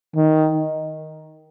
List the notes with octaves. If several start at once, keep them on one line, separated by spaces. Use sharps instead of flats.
D#3